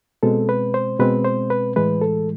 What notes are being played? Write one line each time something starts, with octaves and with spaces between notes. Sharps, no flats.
B2 G#3 C4 A4
B4
C5
B2 G#3 C4 B4
C5
B4
A2 E3 G#3 B4
A4